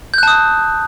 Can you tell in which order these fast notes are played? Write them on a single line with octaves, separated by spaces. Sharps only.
G6 F#6 A5 D#6